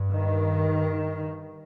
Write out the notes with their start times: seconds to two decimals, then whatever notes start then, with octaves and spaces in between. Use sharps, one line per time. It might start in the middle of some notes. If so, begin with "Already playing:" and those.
Already playing: G2
0.12 D#3